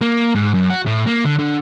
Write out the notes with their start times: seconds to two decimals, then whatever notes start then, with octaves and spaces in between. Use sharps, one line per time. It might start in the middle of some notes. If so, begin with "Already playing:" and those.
0.01 A#3
0.35 G#2
0.54 F#2
0.70 F#4
0.87 A2
1.07 A#3
1.25 D3
1.39 D3